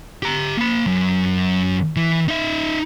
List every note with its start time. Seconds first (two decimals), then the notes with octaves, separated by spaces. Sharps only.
0.23 G4 A#5
0.57 A#3 B5
0.87 F#2
1.96 E3
2.28 D#4 E5